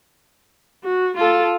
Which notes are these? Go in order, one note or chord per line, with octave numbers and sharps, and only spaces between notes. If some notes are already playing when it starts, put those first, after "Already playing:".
F#4
F4 A4